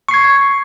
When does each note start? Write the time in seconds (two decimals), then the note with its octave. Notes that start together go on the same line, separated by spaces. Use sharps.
0.09 C#6
0.11 C7
0.14 G#6